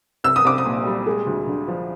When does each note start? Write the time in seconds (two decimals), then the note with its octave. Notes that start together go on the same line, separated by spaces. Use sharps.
0.24 C2 E6
0.36 D#6
0.45 C2 D6
0.58 D#6
0.65 A#2
0.86 G3
1.07 G#3
1.27 D2
1.47 D3
1.68 F3